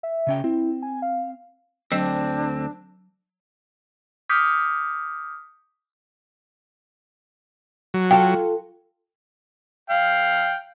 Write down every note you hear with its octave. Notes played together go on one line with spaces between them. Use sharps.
E5
C#3 C#4 G5
C4 E4
G#5
F5
D2 F#3 C4 D4 D#5
D6 D#6 F6 G6 B6 C#7
F#3
F4 A4 G5
F5 G5